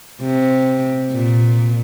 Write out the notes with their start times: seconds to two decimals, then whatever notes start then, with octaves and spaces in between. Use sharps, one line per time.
0.21 C3
1.11 A#2